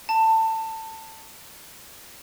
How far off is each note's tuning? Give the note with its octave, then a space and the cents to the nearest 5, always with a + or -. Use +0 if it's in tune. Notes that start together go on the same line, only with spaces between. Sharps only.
A5 +20